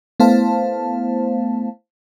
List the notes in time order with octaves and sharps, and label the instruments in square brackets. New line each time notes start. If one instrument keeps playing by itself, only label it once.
[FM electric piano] A3 B3 E4 C5 F5 A5